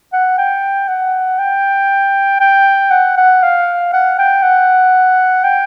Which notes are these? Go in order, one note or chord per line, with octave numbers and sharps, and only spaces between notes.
F#5
G5
F#5
G5
G5
F#5
F#5
F5
F#5
G5
F#5
G5